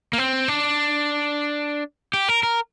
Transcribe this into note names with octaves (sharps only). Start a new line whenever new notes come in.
A#3
C4
D4
G4
A#4
A#4